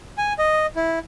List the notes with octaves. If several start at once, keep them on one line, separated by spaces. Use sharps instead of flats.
G#5
D#5
E4